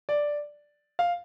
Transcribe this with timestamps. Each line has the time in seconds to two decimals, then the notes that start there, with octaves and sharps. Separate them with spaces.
0.09 D5
0.99 F5